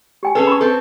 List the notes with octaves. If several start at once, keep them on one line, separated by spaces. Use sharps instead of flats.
G4 G5 G#5
C#4 G#4 A4 B4
B5 C#6
C4 A4 B4